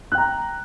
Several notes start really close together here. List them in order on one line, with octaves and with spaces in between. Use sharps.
F#6 G5 A#5